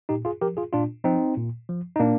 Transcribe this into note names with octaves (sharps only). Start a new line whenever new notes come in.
A#2 D#4 G4
F4 G#4
F3 G4 A#4
F4 G#4
A#2 D4 F4
F3 C4 D#4
A#2
F3
D#4
A#2 A#3 D4